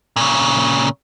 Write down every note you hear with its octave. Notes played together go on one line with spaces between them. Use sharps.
A#2 C#3